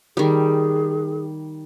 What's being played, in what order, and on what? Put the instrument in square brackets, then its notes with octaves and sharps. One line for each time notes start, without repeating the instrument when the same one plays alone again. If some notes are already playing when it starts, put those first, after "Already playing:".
[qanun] D#3 G3 [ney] G#4